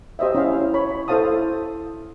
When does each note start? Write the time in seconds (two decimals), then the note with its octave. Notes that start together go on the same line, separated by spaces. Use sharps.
0.19 G4 C5 D#5 E5
0.35 C#4 E4 F5
0.74 C#5 B5
1.08 E4 A4 C5 F5 A5 D#6